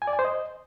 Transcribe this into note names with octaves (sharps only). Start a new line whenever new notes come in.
G#5
D5
G#5
C5
D#5